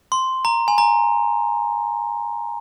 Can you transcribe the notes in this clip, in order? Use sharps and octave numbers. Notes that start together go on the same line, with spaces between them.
C6
A#5
G#5
A#5